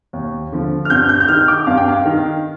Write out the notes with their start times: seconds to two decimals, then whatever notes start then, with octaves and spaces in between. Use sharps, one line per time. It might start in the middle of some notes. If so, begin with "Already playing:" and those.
0.13 D#2
0.52 D3 F3
0.85 F6
0.90 G2 G6
1.09 G6
1.20 G6
1.28 D#3 F6
1.48 D6
1.67 G2 F5
1.77 G5
1.88 F5
2.05 D#3